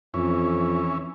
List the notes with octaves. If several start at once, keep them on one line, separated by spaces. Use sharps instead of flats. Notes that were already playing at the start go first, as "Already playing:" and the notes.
F2 E3 C#4